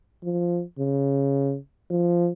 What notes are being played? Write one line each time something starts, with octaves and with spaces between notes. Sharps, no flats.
F3
C#3
F3